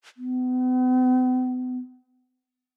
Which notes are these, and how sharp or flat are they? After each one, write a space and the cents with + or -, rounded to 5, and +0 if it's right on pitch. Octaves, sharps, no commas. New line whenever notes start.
B3 +45